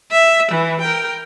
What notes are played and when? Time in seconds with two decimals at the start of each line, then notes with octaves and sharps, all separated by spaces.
0.11 E5
0.51 E3
0.81 A#4 G5